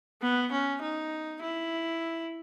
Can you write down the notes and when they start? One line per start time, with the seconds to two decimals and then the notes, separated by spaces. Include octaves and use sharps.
0.22 B3
0.52 C#4
0.82 D#4
1.42 E4